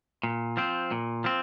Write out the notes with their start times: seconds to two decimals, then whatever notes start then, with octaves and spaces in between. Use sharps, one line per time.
0.23 A#2
0.57 F3 C4
0.91 A#2
1.24 F3 C4